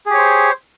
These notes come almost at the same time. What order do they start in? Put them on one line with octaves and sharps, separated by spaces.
G#4 G4 C#5 C5